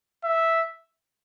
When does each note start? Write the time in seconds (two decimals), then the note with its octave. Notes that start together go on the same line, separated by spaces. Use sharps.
0.24 E5